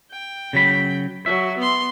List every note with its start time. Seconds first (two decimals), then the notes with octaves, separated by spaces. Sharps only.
0.12 G5
0.53 C#3 F#3 B5
1.26 F#3 E5
1.58 B3 C6